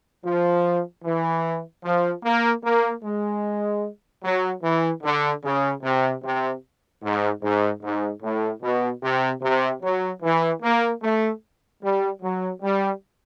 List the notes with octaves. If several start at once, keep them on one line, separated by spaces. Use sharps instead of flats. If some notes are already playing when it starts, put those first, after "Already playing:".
F3
E3
F3
A#3
A#3
G#3
F#3
E3
D3
C#3
C3
C3
G#2
G#2
G#2
A2
B2
C3
C3
F#3
E3
A#3
A3
G3
F#3
G3